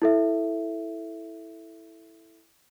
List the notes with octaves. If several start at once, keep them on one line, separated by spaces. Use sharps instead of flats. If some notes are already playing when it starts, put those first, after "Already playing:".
E4 A4 E5